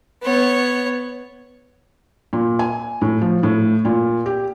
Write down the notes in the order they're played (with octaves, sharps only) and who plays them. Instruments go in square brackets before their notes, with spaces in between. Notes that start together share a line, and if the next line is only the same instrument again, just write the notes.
[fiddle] B3 C#5
[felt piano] A#2
G#5
A2
F3
A2
A#2
G4